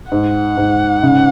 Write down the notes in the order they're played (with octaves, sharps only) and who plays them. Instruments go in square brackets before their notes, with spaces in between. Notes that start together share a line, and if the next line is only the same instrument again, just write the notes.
[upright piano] G#2 [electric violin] F#5
[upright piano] G#2
C#3